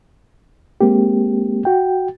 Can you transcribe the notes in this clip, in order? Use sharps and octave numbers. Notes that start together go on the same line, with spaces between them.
G#3 A#3 C4 G4
F#4 G5